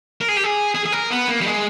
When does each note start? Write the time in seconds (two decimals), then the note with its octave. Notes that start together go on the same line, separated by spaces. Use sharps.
0.21 A#4
0.28 G#4
0.36 G4
0.44 G#4
0.75 G#4
0.86 G#4
0.92 A#4
1.10 B3
1.28 A#3
1.41 G3
1.46 G#3